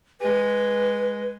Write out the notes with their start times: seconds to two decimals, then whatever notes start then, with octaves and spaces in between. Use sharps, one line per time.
0.21 G#3 B4